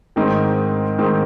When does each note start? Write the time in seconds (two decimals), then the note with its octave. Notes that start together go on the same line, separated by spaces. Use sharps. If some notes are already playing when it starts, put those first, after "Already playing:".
0.16 G#2 D#3 G#3 C4 D#4
0.98 G#2 D#3 G#3 C4 D#4